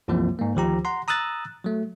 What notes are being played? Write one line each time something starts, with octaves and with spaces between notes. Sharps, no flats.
C2 F#2 C3 E3 F3 A#3
G#2 A#3
D2 D#3 F3 G4 A#5
F#5 A#5 C6
A#5 D#6 E6 F#6 A6
F#3 A3